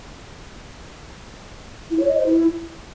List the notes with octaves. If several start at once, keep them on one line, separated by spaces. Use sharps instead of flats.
E4
C#5
D#5
C5
E4